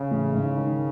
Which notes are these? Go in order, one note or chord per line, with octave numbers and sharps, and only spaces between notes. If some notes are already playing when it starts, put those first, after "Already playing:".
Already playing: C#3
A1
G#2
D#3